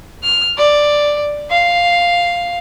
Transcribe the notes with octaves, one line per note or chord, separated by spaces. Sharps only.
F6
D5
F5